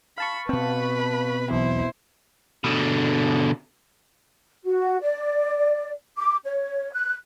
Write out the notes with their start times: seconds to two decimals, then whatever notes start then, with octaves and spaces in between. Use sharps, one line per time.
0.18 F5 A5 B5 C#6
0.49 B2 C4 B4 B5
1.51 B1 E2 E4 C5
2.64 B2 D3
4.65 F#4
5.02 D5
6.18 D6
6.45 C#5
6.93 F#6